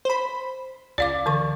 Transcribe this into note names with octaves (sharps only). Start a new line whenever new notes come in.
C5 B5
C#2 D5 F5 D6
D3 E3 C#6